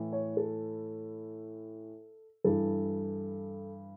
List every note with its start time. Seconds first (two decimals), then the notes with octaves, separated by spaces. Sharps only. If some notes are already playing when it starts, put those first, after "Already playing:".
Already playing: A2 E3
0.13 C#5
0.37 A4
2.44 G2 E3 A4